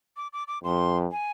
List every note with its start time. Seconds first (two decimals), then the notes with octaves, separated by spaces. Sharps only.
0.17 D6
0.33 D6
0.48 D6
0.64 F2 C6
1.12 G#5